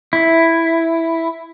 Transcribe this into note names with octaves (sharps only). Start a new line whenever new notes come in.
E4